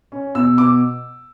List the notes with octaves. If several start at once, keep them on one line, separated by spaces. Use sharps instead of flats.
C#4
B2 E6
B2 D6